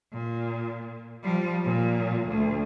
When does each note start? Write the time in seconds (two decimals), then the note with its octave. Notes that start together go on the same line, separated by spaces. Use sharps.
0.12 A#2
1.23 F3 G3
1.64 A#2
2.28 D2